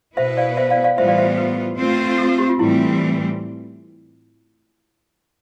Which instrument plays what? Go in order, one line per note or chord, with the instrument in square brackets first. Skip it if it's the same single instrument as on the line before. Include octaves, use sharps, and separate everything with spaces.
[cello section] B2 B3 E4 B4 [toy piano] C5 E5
[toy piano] D5 F5
C5 E5
D5 F5
D5 F5
[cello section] A2 E3 G3 B3 F4 [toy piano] C5 E5
[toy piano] D5 F5
C5 E5
B4
[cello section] A3 C4 F4 C5
[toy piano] A4
A4
G4
F4
[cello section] A2 E3 G3 C4 [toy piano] E4